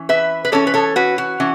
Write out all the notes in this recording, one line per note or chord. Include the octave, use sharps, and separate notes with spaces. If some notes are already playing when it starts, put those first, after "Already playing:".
Already playing: E3 C#4
B4 E5
B4
E3 C#4 A4 C#5
B4
A4 C#5
F#4 B4
F#4
E3 C#4